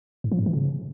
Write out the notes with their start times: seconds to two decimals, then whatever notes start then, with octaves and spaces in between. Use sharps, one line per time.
0.24 G#2
0.32 F3
0.39 G#2
0.46 E3
0.53 C#3